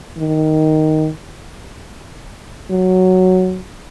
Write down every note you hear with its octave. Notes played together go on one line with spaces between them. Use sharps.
D#3
F#3